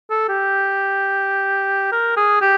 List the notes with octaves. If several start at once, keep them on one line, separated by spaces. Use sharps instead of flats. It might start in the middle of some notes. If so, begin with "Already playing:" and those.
A4
G4
A#4
G#4
G4